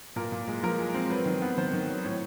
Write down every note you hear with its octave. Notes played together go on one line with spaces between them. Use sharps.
A#2 A#4
A#2
G#3
F3 A#4
G#3
C4
F#3 B4
D#3
B3
D#3 C5
D#3
F#3
A2 C#5